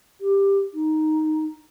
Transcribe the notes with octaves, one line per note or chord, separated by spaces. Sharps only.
G4
D#4